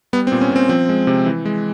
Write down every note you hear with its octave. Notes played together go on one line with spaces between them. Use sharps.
G3 B3
C4
A#2
C#4
A#2 C4
F3 C4
G#3
C3
E3
G#3